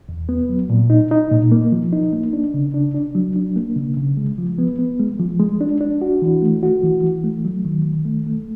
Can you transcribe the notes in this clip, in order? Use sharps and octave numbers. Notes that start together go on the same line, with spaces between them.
E2
B3
F#3
A#2
D#4
D#4
A#2
A#3
F3
D#4
A#3
D4
C#3
D4
D4
F#3
D4
A#3
C#3
C#3
G#3
F3
B3
B3
G#3
F3
G#3
D4
D4
F#4
E3
A3
F#4
E3
E3
A3
F#3
D#3
D#3
A3
A3